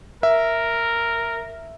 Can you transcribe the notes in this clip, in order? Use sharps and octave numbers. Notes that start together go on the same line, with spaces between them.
A#4 E5